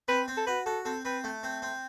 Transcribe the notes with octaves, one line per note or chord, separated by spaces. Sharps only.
C4 B4
C4
A4
F#4 B4
F#4 A4
C4 A4
C4 B4
A3
C4
C4